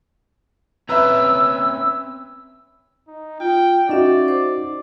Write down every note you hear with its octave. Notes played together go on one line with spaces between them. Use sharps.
C4 C#4 B4 E5 A#5 E6
D#4
F4 G5
C#4 D#4 F#4 D5 E5
C5 D6